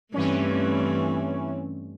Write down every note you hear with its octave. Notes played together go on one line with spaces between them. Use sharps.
G2 E3 A3 C4 C#4